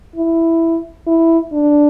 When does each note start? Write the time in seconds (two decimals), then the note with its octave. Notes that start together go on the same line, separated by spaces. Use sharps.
0.16 E4
1.07 E4
1.53 D4